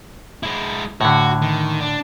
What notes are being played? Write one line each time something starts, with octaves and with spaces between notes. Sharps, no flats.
G#3 E4
A2 D3 F#4
D#3
D4